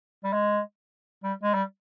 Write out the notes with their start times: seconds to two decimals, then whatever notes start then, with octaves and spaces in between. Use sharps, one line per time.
0.24 G3
0.33 G#3
1.24 G3
1.43 G#3
1.54 G3